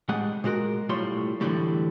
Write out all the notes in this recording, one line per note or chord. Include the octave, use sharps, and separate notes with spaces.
A2 G3 G#3 G#4 F#5
A#2 G#3 F#4 A#4
B1 A2 G3 F4 C#5 C6
A2 D3 E3 F#3 G3 A3